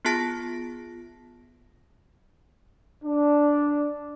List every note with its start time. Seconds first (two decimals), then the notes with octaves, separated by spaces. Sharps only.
0.05 B3 F4 G#4 A5 A#6 D7
3.04 D4